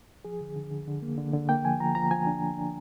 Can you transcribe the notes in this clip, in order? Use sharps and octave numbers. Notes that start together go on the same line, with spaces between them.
F3 G#4
D3
D3
D3
D3
A#3
D3
D3
A#3 G5
F3 G#5
F3 A#5
F3 A#5
F3 G#5
D4
F3
D4